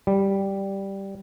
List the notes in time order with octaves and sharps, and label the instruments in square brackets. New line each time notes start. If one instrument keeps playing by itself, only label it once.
[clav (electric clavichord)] G3